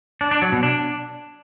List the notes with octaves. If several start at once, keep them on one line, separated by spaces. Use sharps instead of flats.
D4
D4
F#3
B2
D4